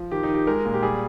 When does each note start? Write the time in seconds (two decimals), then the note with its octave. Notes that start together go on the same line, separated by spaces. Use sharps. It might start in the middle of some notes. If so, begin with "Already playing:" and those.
Already playing: F3
0.11 D#3 G4
0.23 D#4
0.29 D#3
0.35 G4
0.47 G#3 A#4
0.66 A#2
0.74 G4
0.82 G3 G#4